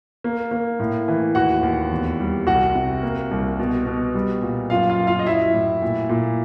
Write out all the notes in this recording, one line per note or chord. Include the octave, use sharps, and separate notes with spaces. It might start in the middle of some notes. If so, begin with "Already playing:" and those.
A#3
A#3
A2
E3
D#2 F#4 F#5
D#2
E2
G3
C2 F#4 F#5
C3
A#3
C2
B2
B2
G3
A#2
F#2 F4 F5
F4 F5
F#2
F4 F5
D#5
F#3 E4 E5
A2
A#2
A#2